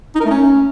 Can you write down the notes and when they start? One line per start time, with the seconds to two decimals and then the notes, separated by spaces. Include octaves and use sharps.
0.15 D#4
0.20 A#4
0.25 A3
0.30 C#4